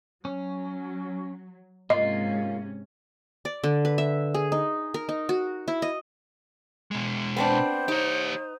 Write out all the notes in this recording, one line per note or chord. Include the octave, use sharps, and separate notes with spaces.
F#3 C#4
G#2 C3 A#3 C#4 F4 D#5
D5
D3
B4
E5
G#4
D#4
A#4
D#4
F#4
E4
D#5
B2 G#3
B3 C4 D4 C5
D#4 G4 C#5